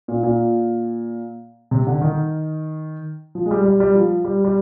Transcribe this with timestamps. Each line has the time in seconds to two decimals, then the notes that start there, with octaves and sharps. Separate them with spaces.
0.08 A#2
0.23 A#2
1.71 C3
1.87 D3
2.01 D#3
3.35 F3
3.46 G#3
3.51 G3
3.65 G3
3.80 G3
3.95 F3
4.25 G3
4.45 G3